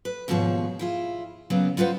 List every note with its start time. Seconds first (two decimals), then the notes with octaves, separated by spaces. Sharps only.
0.05 B4
0.28 D#2 G#2 B2 F3 G#4 C#5
0.79 E4 F4 G#4
1.50 C#3 F#3 A#3 B3
1.77 G3 F4 B4 C5 F#5